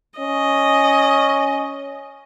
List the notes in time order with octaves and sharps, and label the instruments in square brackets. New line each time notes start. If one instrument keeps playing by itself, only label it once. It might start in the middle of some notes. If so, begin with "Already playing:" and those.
[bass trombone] C#4 [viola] D#5